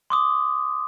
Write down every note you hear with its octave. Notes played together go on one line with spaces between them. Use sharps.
C6 D6 D#6